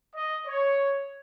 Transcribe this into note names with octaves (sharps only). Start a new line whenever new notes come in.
D#5
C#5